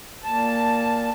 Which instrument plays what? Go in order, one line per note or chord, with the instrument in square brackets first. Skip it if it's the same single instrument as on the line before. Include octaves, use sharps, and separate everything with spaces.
[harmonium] A#2 A5